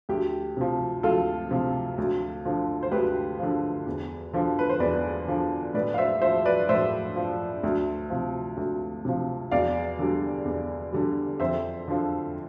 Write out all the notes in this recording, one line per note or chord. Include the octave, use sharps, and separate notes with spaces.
D2 G4
C3 F3
D2 F4 A4
C3 F3
D2
D3 F3
C5
D2 G4 B4
D3 F3
E2
D3 F3
B4
C5
E2 B4 D5
D3 F3
A2 B4 D5
F5
C5 E5
F3 C5 E5
B4 D5
A2 C5 E5
F3
D2
C3 F3
D2
C3 F3
E2 D5 F5
D3 G3
E2
D3 G3
F2 C5 E5
D3 F3